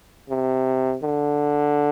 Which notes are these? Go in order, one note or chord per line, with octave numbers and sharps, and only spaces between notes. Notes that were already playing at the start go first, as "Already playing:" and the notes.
C3
D3